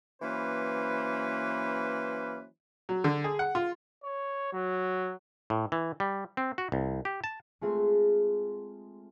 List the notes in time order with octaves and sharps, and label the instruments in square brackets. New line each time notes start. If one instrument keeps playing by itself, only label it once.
[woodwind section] E3 F#3 A#3 C#4 B4 C5
[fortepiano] F#3
D3
G#4
F#5
F4
[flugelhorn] C#5
F#3
[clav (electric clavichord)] A2
E3
G3
C4
F#4
C2
G4
A5
[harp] G#3 A3 C4 F4 G#4